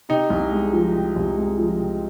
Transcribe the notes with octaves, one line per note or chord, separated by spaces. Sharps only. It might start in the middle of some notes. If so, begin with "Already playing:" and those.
C3 D#4
C2
G#3
F3
C3
C2
G#3
F3
C3